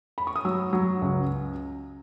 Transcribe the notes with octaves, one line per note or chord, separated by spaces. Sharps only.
B5
C#6
D#6
F#3 E6
F#3
C#2